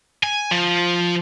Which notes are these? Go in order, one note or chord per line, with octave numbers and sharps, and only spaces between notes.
G#5
F3